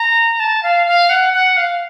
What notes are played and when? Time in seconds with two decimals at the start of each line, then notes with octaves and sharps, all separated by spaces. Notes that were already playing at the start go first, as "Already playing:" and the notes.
Already playing: A#5
0.40 A5
0.63 F5
0.87 F5
1.10 F#5
1.33 F#5
1.57 F5